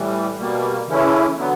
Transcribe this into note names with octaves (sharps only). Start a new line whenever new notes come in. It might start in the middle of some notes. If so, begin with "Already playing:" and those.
Already playing: A2 E3 G3
B2 G3 A#3
C#3 E3 A3 C#4 E4
D3 F#3 B3